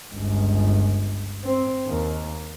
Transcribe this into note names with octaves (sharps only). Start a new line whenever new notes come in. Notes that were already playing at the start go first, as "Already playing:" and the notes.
G1 C#2
C4
D#2 A#3